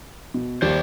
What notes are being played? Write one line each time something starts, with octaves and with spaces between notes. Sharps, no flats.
B2
D#2 G3 G4 C5 D5